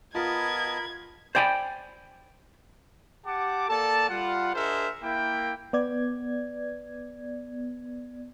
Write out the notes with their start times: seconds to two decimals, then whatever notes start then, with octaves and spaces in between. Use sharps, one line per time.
0.15 B3 F4 A#4 D#5 A5 B5 G#6
1.35 C5 D5 G5 G#5 B5
3.26 G4 F#5 A5 D6
3.69 A#3 A4 D5 A5
4.09 G3 F4 F#5
4.54 D4 G#4 A#4 C5 D#5 E5
5.02 A#3 E4 G5
5.73 B3 D5 G#6